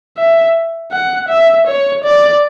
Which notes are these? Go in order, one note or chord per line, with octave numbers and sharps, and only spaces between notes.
E5
F#5
E5
C#5
D5